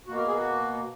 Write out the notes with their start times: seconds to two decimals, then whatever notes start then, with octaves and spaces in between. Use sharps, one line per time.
0.07 B2 A#3 F#4
0.17 A#4
0.26 G#4
0.36 F#4